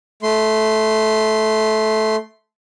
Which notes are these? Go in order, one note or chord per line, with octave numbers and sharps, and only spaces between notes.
A3 C6